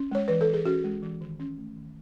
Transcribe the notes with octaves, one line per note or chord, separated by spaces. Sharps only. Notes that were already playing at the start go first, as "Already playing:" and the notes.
Already playing: C#4
G#3 C#5
E3 B4
A4
E3
G#4
C#4 F#4
G#3
E3
D#3
C#4
A3
D#3